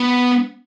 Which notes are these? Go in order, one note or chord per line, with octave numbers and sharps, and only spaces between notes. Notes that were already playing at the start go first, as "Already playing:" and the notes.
Already playing: B3